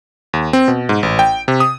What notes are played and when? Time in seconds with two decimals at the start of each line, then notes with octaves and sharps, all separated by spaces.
0.33 D#2
0.53 C4
0.68 B2
0.89 G#2
1.03 A1
1.19 G5
1.48 C3
1.60 D#6